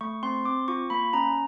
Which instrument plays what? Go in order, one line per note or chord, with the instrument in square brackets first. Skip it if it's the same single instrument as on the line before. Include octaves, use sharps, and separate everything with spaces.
[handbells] A3 C#6
C4 C6
C4 D6
F4 C#6
A#3 B5
C#4 A#5